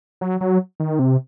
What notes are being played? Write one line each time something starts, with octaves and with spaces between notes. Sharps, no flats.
F#3
F#3
D#3
C3